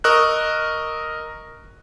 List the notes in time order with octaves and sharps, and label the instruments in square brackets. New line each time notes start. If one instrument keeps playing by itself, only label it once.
[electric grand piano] A#4 D#5 C#6 D#6 E6 F#6